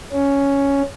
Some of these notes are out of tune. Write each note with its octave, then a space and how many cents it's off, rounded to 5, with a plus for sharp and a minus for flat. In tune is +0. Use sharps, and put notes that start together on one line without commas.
C#4 +5